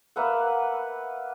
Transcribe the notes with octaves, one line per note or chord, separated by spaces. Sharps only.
A#3 B4 E5 F#5